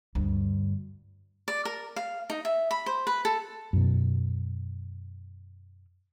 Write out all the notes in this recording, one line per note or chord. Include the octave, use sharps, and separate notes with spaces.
D2 G2
D5
A#4
F5
D#4
E5
B5
C5
B4
A4
F#2 B2